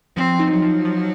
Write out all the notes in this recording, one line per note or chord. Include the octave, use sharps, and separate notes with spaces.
F3 C4
D#4
F#3
F3
F3